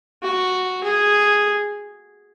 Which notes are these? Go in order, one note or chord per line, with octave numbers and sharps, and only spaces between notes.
F#4
G#4